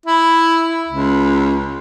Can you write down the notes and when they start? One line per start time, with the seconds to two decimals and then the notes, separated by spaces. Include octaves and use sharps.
0.06 E4
0.88 C#2